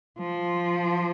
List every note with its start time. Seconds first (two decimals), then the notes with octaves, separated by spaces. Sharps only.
0.19 F3